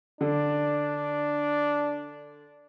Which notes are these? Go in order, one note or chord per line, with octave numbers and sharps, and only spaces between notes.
D3 D4